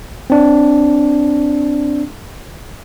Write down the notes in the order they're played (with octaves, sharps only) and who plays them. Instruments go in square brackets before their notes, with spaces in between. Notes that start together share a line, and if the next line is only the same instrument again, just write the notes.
[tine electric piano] C4 D4